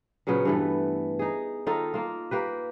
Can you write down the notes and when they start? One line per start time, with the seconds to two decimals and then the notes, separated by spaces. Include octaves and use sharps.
0.27 A#2 C#3 F#3 B3
0.45 G2 E3 A3
1.19 D#4 G#4
1.66 D#3 D#4 F4 A4
1.94 A#3 F4
2.31 A#3 G4 B4